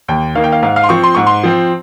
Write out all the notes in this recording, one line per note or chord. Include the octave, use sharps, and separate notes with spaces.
D#2 G5
D#3 A#3 F5
G5
F5
G#2 F5
F5
C6
F3 C4 C#6
C6
G#2 C#6
C6
F3 C4